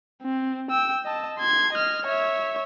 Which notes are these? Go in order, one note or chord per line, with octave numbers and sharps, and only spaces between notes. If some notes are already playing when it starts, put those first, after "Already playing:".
C4
G5 E6
D#5 A5
C6 G#6
D#5 F6
C#5 E5